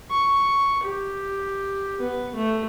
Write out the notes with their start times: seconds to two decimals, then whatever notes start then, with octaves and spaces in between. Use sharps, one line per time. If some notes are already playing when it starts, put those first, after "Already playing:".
0.10 C#6
0.83 G4
2.00 B3
2.35 A3